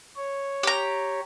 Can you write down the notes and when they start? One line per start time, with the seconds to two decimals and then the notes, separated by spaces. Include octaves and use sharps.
0.16 C#5
0.63 G4 A#5